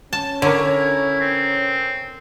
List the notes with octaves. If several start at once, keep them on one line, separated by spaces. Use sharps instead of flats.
C#4 A5
D3 E4 A#4 C#5
C4